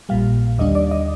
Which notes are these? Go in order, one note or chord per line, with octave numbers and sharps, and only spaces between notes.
A#1 A#2 G3 F5
D#2 D3 G3 D4 D#5
D5
D#5